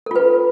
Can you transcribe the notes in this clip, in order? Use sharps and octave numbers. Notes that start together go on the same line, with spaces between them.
F4 A4 B4